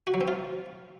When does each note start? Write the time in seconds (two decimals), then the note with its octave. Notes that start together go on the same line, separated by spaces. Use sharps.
0.07 F#4
0.14 F#3
0.21 C4
0.28 F4